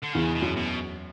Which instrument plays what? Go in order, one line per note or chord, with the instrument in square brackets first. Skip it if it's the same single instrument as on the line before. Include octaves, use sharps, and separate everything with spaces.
[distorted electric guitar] D3
[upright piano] E2 E3 [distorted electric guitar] C#3
[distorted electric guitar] B2
[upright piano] F#2 F#3
[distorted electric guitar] B2